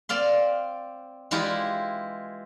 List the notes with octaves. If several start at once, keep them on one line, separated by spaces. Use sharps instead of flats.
C4 D5 F5 C6
E3 G#3 E4 F4 G4 G#4